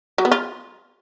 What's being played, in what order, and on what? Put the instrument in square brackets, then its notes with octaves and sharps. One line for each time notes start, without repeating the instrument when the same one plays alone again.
[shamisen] F#3
B3
F4